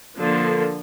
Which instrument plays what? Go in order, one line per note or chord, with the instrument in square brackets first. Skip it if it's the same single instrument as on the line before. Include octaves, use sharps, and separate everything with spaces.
[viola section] D3 F3 A#3